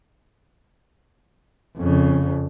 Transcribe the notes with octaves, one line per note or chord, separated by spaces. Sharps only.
F2 C#3